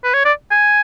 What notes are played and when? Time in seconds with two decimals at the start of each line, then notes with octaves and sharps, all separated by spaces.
0.04 B4
0.14 C#5
0.25 D5
0.51 G#5